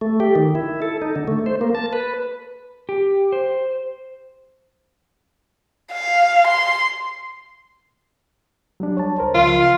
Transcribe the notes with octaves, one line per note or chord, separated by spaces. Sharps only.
A3
G4
D#3
E4
A4
D#4
D3
A3
C5
A#3
A5
B4
G4
C5
F5
C6
F#3 G3 D4
C#5 A5
C#2 A#4 C5
C#3 F3 F4 C6